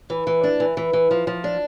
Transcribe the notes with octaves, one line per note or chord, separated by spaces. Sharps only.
E3
E3
D4
E3
E3
E3
F3
F3
D4